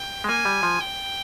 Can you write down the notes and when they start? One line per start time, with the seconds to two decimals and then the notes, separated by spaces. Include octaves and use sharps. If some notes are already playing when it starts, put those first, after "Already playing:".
Already playing: G5
0.24 G#3
0.28 A#3 G#5
0.45 G3
0.63 F3
0.81 G5